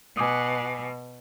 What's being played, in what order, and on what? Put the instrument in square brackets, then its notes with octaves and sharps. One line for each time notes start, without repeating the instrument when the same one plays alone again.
[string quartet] B2 [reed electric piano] G#5 D6 D#6